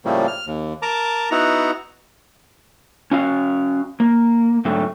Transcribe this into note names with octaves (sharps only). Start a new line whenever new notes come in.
A2 C#3 F3 G3 A3 A#3
F6
D#2
A#4 A5 A#5 D6
B3 D#4 E4 F#4 F#5 A#5
C#4 F#4 F5
A#3
G#2 D3 F#3 A3 C4 F#4